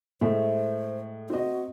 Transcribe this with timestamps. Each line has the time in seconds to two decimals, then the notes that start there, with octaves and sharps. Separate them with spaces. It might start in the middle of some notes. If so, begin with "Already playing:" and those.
0.21 A2 G#3 A3 C5
1.30 C4 F#4 D#5